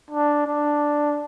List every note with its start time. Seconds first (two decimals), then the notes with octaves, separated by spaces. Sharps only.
0.11 D4
0.46 D4